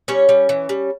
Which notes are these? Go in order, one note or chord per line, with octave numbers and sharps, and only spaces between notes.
G3 C#4 C#5
G3
E3
G3